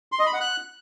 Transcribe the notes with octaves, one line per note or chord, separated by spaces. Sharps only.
C6
D#5
B5
F#5
F#6